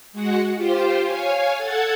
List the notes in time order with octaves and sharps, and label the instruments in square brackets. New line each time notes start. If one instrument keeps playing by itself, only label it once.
[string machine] G#3 F#4 F#5
F4 G4 C5
C#5 F5 G#5
A4 F#5 A5 G#6